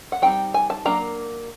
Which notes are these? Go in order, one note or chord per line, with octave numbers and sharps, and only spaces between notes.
F#5
G3 C4 D#4 G5
G#5
A5
F#3 A#3 D4 A#5